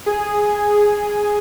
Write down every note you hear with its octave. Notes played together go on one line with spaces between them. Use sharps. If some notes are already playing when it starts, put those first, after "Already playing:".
G#4